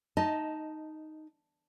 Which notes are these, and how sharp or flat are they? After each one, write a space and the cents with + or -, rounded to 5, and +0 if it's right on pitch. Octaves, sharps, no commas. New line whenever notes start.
D#4 +0 D#5 +15 A5 +0